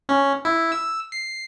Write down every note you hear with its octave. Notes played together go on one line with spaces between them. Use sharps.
C#4
E4
E6
C7